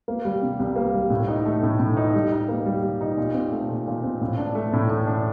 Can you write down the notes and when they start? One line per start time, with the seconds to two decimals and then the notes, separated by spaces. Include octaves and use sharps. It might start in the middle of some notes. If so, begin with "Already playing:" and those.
0.08 A#3
0.25 G3
0.42 C3
0.60 C2
0.76 A#3
0.93 G3
1.10 A2
1.28 D#4
1.45 A3
1.63 A2
1.80 A2
1.97 D#4
2.14 G3
2.32 D#4
2.48 A#3
2.66 G3
2.83 G3
3.01 D#4
3.17 A#2
3.34 C4
3.52 A3
3.69 A#2
3.87 A#2
4.04 C4
4.21 A2
4.38 D4
4.55 A3
4.73 A2
4.90 A2
5.07 D4